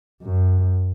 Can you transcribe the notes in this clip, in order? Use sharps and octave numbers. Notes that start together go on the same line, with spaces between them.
F#2